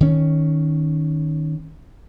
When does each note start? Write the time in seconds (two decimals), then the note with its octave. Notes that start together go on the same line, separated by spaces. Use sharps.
0.01 D#3 C#4